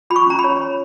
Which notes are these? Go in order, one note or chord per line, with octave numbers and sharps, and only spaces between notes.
F4 B5
C#6
C#4 A#5
B5
C#5
C#5